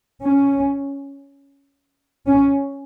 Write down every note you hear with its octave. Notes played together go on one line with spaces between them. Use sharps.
C#4
C#4